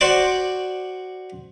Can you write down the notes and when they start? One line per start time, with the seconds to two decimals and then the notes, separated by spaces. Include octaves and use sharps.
0.01 F#4 C5 D5 D6